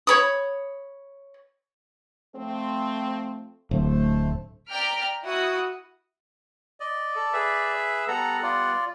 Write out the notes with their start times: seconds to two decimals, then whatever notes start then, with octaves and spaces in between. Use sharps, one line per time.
0.07 C#5 B5 D#6
2.35 F3 A3 C4
3.71 D1 A3 C5
4.70 D5 G5 A#5 F6 B6 D7
5.24 E4 F#4 F#5 D#6
6.80 D5 D#5
7.16 A4
7.33 G#4 B4 E5
8.08 G3 B3 A4 F#5 A#5
8.43 F4 D5